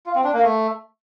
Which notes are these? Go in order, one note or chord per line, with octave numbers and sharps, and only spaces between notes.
F4
C4
D4
A#3
A3